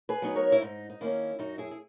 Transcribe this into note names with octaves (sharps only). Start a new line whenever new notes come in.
G#4 B4
F#3 B3 D#4
A#4 C#5
E4
G#2 D#4
D#4
D#3 A#3 C#4 E4
F#2 D#4 F#4
E4 G#4
G#4